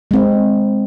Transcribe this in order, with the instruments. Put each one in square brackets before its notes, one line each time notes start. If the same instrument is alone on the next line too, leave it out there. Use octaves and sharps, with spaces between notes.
[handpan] G#3 C4